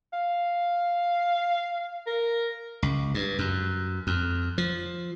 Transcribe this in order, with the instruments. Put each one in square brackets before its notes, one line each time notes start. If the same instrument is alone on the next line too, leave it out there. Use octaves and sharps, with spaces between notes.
[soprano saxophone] F5
A#4
[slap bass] C#2
G2
F#2
F2
F3